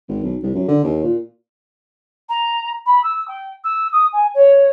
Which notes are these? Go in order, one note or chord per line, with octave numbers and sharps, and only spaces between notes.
G#1
B1
C2
F#2
D3
D#2
A#2
A#5
B5
E6
G5
E6
D#6
G#5
C#5